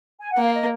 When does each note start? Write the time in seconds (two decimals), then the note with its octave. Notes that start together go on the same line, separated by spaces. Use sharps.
0.19 G#5
0.31 F#5
0.38 A#3 F5
0.53 D#5